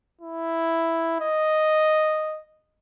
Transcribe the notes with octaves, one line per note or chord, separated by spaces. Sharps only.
E4
D#5